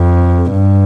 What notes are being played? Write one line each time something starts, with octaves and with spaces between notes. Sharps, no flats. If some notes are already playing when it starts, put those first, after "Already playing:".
Already playing: F2
G2